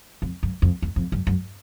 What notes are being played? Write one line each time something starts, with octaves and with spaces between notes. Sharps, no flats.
F2
F#2
F2
E2
F2
F#2
F#2